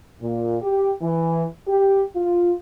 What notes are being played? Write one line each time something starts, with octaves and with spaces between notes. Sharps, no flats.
A#2
G4
E3
G4
F4